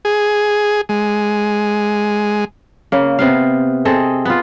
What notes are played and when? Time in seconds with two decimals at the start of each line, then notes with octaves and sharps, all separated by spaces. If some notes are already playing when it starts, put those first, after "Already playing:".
0.05 G#4
0.89 G#3
2.92 C#3 A#3
3.19 C3 B3 F5
3.85 C4 G#4 A4 D#5
4.25 B3 F4